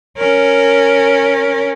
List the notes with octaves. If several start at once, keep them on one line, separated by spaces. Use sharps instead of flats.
C#4 A#4